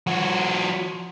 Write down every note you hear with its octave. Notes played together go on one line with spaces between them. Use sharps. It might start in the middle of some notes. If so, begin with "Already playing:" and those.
F3 F#4